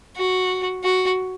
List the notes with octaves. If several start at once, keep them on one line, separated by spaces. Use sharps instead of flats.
F#4
F#4